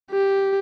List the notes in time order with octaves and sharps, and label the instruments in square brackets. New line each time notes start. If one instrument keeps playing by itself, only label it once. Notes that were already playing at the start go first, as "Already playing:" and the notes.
[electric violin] G4